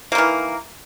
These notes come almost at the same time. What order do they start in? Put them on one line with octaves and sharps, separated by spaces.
A#3 D#3 E3